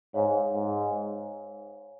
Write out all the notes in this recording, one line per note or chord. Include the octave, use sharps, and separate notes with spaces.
G#2 C#5 F5 G#5
G#2